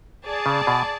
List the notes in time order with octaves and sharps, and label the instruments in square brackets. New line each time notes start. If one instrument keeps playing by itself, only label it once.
[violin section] G#4 D5 A5
[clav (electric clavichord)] C#3
B2